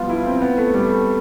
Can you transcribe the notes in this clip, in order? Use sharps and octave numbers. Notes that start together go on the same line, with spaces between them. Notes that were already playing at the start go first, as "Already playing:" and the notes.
Already playing: F3 G3 B3 F4
E4
C4
B3
A3
G3
A3